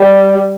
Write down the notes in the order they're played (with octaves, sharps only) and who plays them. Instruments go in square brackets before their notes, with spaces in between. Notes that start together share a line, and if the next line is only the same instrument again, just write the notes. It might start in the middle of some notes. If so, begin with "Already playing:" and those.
Already playing: [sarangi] G3